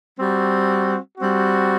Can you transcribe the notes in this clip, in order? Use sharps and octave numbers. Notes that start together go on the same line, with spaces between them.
G3 C4 F#4
G3 C4 F#4